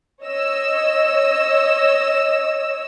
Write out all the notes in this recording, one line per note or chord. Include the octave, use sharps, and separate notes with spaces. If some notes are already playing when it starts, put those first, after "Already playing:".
C#5 D#5 E6